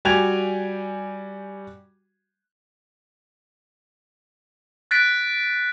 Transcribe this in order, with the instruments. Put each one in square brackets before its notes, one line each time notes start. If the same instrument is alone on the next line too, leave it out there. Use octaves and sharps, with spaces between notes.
[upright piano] G3 F#4 G5 G#5 G#6 F7
[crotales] F#6 A6 B6 D7